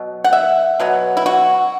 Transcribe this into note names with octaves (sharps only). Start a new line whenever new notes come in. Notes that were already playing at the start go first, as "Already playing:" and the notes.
Already playing: B2 F#3
F#5
E5
B2 F#3 B3
E4
F#4